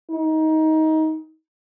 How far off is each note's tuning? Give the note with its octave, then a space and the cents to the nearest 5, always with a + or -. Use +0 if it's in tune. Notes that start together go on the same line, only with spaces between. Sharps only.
D#4 +20